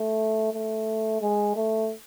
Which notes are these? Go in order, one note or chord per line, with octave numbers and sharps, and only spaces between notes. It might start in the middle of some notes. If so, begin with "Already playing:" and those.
Already playing: A3
A3
G#3
A3